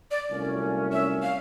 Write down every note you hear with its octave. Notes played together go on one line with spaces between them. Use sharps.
D5
C2 A#2 F#3 A3 C#4
E5
F5